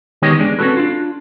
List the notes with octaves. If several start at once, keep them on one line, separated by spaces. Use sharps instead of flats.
D#3 G#3 B3 G4 C#5 D#5
E2 G#3 D4
C4 C#4 D#4 F#4 A4 B4
D4 F4